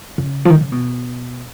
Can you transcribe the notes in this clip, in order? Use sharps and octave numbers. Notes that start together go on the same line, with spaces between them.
C#3
F3
D#3
C#3
B2